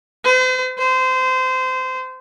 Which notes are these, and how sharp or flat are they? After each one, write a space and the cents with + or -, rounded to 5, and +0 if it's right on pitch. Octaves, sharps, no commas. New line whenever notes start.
C5 -40
C5 -25